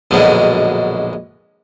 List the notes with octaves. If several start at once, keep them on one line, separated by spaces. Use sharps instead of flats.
A#1 F#2 B2 D3 G#3